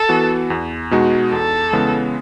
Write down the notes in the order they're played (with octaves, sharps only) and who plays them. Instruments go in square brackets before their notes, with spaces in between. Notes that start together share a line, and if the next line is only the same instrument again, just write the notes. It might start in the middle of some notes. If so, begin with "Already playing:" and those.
Already playing: [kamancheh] A4
[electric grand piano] E3 B3 F#4
E2
B2 G#3 D#4 F#4
[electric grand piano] E2 [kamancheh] A4
[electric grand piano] C#3 E3 G#3 B3